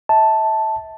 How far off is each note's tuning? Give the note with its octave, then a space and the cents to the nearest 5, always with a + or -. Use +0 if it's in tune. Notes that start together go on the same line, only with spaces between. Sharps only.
E5 -40 A5 +0